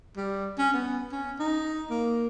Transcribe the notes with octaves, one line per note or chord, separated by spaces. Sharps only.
G3
C#4
B3
C#4
D#4
A#3